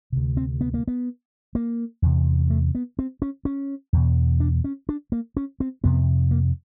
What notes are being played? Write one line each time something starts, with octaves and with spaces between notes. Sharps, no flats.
D2 C3
C4
B3
A#3
B3
A#3
E2 C3
A3
B3
C4
C#4
C#4
E2 B2
D4
C#4
D4
A#3
C#4
C4
F2 C3 B3
A#3